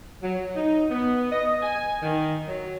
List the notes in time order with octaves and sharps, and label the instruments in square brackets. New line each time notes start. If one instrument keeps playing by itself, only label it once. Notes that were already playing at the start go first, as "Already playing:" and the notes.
[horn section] F#3
D#4
B3
D#5
G#5
D#3
F#3